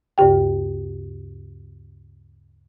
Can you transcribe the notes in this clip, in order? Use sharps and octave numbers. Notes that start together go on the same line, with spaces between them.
D2 G2 C#3 G4 G5